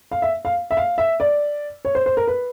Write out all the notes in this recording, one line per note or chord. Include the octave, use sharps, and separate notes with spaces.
F5
E5
F5
E5
F5
E5
D5
C#5
C5
C5
A#4
B4